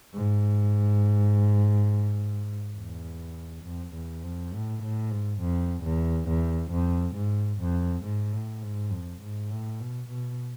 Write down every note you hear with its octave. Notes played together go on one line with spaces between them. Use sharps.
G#2
E2
F2
E2
F2
A2
A2
G#2
F2
E2
E2
F2
G#2
F2
G#2
A2
G#2
F2
G#2
A2
B2
B2